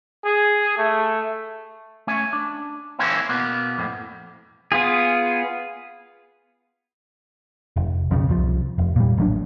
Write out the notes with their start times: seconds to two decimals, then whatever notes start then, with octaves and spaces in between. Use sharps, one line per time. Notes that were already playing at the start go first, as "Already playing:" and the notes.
0.25 G#4
0.77 A3
2.07 A3 C#4 G#5
2.33 D4
2.99 E3 A#3 C4 C#4 E4
3.29 B2 A#3 B3
3.78 F2 A2
4.72 B3 F4 G#4
7.76 F1
8.11 B1 F2 C#3
8.29 C2 F3
8.78 F1
8.96 A#2 G3
9.18 A1 F#3 D4